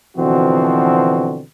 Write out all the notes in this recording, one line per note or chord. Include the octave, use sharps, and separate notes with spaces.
B2 D3 E3 F3 C4 F#4